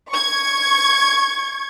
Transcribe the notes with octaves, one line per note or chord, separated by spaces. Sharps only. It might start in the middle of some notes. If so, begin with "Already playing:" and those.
C#6 G#6